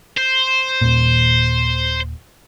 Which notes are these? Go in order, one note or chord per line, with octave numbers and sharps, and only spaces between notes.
C5
D#1 A#2